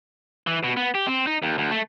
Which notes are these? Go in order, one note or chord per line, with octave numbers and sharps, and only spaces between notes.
E3
B2
B3
G4
C4
D#4
D#2
D2
A3